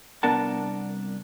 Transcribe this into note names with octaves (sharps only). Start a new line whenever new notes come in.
C2 B3 D4 A#4 F#5 A5